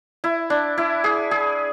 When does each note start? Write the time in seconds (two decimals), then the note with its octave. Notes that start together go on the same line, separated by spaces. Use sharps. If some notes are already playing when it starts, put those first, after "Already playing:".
0.24 E4
0.50 D4
0.78 E4
1.04 G#4
1.31 G#4